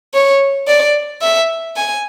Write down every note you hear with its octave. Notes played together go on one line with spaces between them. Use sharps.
C#5
D5
E5
G#5